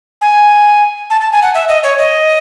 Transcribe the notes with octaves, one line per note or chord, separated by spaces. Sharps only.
G#5
A5
A5
G#5
F#5
E5
D#5
C#5
D#5